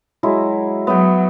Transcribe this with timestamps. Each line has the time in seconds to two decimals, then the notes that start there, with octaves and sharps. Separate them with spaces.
0.23 F#3 G#3 E4
0.87 F#3 B3 E5 G5